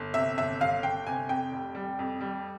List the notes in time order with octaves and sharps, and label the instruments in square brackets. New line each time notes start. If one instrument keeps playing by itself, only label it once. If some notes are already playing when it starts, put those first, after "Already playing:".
Already playing: [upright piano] G1
C3 E5
G1 E5
G1 F5
G1 G5
C3 G#5
F2 G5
F1
G3
F2
G3